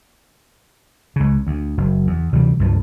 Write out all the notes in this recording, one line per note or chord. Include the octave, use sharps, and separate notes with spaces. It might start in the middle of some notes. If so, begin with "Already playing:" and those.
C#2 C#3
D2
F#1
E2
D2 C3 E3 G3
C#2 G2 F3